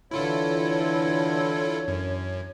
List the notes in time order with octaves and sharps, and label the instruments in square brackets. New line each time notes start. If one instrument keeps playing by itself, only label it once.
[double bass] D3 E3 [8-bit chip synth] E4 F4 A4 [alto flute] C#5
[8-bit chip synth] F#2